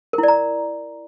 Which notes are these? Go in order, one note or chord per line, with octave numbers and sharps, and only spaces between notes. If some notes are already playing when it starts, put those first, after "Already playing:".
A#4
E4
D5
A#5